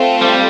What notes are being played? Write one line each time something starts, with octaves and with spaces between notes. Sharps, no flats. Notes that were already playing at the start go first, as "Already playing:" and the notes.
Already playing: A3 C4 F4
G3